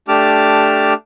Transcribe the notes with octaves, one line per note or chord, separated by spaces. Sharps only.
A3 D4 G4 A5 D6 F6